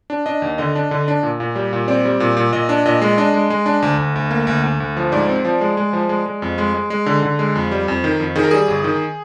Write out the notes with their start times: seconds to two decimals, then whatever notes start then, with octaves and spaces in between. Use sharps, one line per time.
0.10 D4
0.26 D4 D#5
0.42 D#2
0.58 D3 D#5
0.75 D4
0.91 D3
1.08 D4
1.23 A#2
1.40 A#2
1.56 G3
1.73 A#2
1.88 C4 D5
2.05 G3
2.20 A#2
2.37 A#2
2.52 A#2 D#5
2.69 D4
2.86 A#2 D#5
3.02 G#3
3.17 D4 D#5
3.34 G#3
3.50 G#3
3.66 D4
3.82 D2
3.98 D2
4.16 D2
4.31 A#3
4.47 D2
4.63 D2
4.80 D2
4.97 F3
5.12 G#2 D5
5.29 C4
5.45 F3
5.61 G#3
5.77 G#3
5.93 F3
6.09 G#3
6.26 G#3
6.42 F2
6.58 G#3
6.74 G#3
6.90 G#3
7.06 D3
7.23 D3
7.39 G#3
7.55 F2
7.71 G3
7.88 F2
8.04 D#3
8.20 F2
8.36 D#3 G#4
8.44 A#4
8.51 G3 G#4
8.68 G1
8.84 D#3